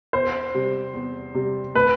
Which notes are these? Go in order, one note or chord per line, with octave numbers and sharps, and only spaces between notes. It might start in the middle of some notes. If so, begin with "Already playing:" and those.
E2 C5
C3 G3
E2
C3 G3
A3 B4